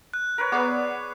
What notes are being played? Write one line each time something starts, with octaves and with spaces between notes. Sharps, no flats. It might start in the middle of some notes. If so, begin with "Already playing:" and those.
F#6
A#4 B4 C#5
B3 G#4 B4 D5 D6